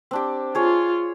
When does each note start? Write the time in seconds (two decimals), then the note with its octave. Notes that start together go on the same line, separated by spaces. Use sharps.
0.11 C4 D4 G4
0.55 F4 G#4 C#5